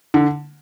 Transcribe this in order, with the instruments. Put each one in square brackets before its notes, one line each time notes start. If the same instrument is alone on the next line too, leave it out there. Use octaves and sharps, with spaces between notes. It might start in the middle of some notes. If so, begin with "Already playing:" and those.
[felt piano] D3